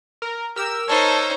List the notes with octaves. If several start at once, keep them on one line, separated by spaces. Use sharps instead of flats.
A#4
G4 A#4 E6
D#4 C5 C#5 A5